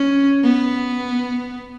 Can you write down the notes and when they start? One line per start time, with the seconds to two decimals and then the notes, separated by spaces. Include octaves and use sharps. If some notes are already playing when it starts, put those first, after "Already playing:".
Already playing: C#4
0.44 B3